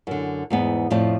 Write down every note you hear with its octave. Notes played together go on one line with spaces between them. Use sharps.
F#2 D3
E2 G#2 B3
F2 A2 F3 D5 A5